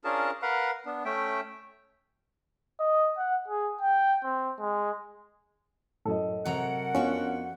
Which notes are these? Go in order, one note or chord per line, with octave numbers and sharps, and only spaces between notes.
C#4 D4 F4 G#4 A#4 A5
A#4 B4 F5 F#5
B3 D4
A3 C#4 E5 G5
D#5
F#5
G#4
G5
C4
G#3
F#2 A2 A4 D#5
C3 F#3 A#4 F#5 A#5
F2 B3 C#4 D4 F4 F#4 G5